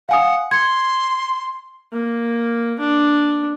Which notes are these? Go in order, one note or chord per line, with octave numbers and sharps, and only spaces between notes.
F5 F#5 G#5 D#6
C6 G#6 C#7
A#3
D4